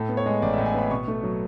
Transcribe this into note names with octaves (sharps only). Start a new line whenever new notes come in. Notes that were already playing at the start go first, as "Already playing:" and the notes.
Already playing: A2 A4
B3
C#5
G#3
A1 D5
A2 E5
G#5
B3 B5
B2 C#6
A3
F#3